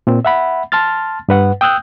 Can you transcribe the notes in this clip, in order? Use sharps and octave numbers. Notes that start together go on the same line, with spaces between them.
A#2 C4
E5 F#5 B5
A5 C6 F6 A6
G2 B4 F#5
G5 D#6 E6 F#6 G6